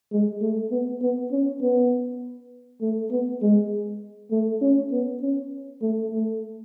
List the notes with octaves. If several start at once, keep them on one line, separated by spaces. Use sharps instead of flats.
G#3
A3
B3
B3
C#4
B3
A3
B3
G#3
A3
C#4
B3
C#4
A3
A3